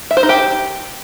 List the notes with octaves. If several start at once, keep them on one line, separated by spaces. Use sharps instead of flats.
E5
C5
D#4
G4